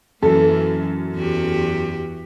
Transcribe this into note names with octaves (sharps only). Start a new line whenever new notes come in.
F#2 E3 A#3 A4
E2 F#4 G4